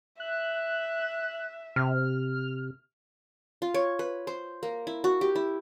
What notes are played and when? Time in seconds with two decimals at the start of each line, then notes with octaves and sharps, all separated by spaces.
0.20 E5 F#6
1.76 C3 F6
3.62 F4
3.74 C#5
3.99 B4
4.27 C5
4.63 A#3
4.87 E4
5.04 F#4
5.21 G4
5.36 E4